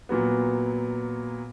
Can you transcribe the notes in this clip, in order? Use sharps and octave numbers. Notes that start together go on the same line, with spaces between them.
A#2 F#3 B3